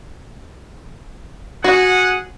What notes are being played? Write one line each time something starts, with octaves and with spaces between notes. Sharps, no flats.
F#4 G#4 F#5